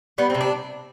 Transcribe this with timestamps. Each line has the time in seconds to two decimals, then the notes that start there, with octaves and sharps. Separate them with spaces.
0.18 G3 B3
0.30 C3 C4
0.41 D4